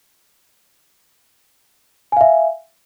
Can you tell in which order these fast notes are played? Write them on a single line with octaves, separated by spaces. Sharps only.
G#5 F5 E5